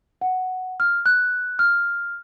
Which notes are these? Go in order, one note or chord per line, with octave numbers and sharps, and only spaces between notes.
F#5
F6
F#6
F6